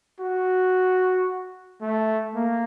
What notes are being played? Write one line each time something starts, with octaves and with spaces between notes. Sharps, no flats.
F#4
A3
A#3